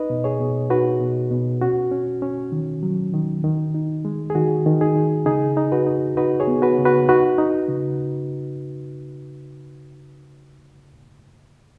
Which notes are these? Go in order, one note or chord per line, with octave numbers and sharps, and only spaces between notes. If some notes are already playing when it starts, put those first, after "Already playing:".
Already playing: D#4 B4 D#5
B2
G#4 C#5
B2
D#4 F#4 B4
B2
B2
C#4 F#4
C#4
C#4
D#3
F#3
D#3
D#3
D#4
G#3
G#4
D#3 F#4
D#3
D#4 G#4
D#3
C#3 D#4 G#4
D#4
F#4 B4
D#4
D#4 F#4 B4
G#4 C#5
B3
F#4 B4
C#3
F#4 B4
D#4 F#4 B4
D#4
C#3